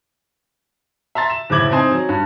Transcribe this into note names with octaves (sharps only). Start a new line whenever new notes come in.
E5 A#5 C6 A6
E7
F#1 A2 E4 D6 G#6 F#7
C4 D#4 C5 G#5
F#3
G2